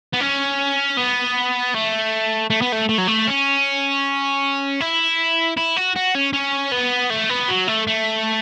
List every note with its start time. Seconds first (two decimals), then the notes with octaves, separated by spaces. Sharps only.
0.13 B3
0.20 C#4
0.97 B3
1.74 A3
2.50 A3
2.62 B3
2.72 A3
2.89 A3
2.98 F#3
3.08 A3
3.27 C#4
4.80 E4
5.57 E4
5.76 F#4
5.96 F#4
6.15 C#4
6.33 C#4
6.72 B3
7.10 A3
7.30 B3
7.48 F#3
7.68 A3
7.87 A3